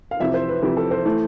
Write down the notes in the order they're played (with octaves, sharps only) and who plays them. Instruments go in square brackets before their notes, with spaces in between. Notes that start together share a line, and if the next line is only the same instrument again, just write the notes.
[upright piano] F5
F2 C3 E3 E5
C5
B4
F2 C3 E3 G4
A4
C5
E3 A3